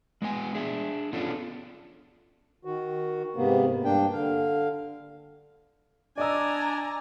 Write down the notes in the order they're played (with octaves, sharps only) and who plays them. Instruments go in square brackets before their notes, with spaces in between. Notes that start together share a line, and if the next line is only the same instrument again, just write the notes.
[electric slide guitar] G#3 B3 C5 G#5
D4 G#4 E5
B3 C#4 D4 F4 A4
[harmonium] D#3 F#4
G#2 C3 A#3 B3
G2 A#3 D4 G5
D3 F5
[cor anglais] D4 [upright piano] D5 D#5 E6 [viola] G#5 A#5